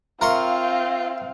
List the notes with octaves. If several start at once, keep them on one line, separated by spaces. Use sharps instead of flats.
C4 F4 A#4 E5 F5 C6 C#6 F6